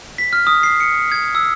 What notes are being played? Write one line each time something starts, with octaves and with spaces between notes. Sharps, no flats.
B6
F6
D#6
C7
C#7
G#6
E6